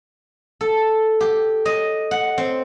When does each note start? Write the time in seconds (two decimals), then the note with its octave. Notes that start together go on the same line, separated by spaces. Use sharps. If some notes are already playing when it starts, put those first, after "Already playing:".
0.61 A4
1.21 G4
1.65 D#5
2.11 F#5
2.38 C4